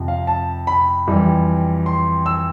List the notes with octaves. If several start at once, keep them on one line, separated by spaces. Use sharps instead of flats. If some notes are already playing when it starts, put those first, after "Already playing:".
Already playing: F2 C3 F3
F5
A5
B5
F2 E3 G3
C6
E6